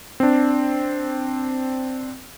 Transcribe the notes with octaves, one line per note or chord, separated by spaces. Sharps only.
C4 D4